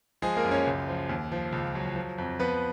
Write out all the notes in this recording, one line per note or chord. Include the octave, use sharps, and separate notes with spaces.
F3 G#3 G#4
A#3 A#4
F#2
C#4 C#5
C#2
F3
D#2
F3
C#2
F#3
F3
F2
F3 B3 B4